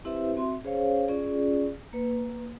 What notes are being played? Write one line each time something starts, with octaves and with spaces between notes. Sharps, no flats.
C4 E4 G4 B4 C5 E5
C4 F#4 E5 C6
C#4 G#4 C5 C#5 F5
C#4 F4 G#4 D5
A#3 B4